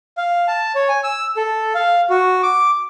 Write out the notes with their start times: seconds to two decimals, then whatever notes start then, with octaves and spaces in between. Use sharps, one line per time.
0.17 F5
0.48 A5
0.75 C#5
0.89 G#5
1.04 E6
1.37 A4
1.75 F5
2.10 F#4
2.43 D6